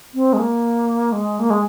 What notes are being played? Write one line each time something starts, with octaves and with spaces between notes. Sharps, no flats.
C4
G#3
A#3
G#3
A#3
G#3